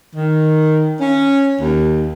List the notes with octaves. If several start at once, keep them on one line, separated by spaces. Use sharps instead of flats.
D#3
C#4
D#2